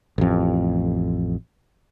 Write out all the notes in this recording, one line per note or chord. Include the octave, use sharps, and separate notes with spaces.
A1 F2